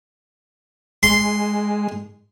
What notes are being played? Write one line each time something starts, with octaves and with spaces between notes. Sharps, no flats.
G#3 C6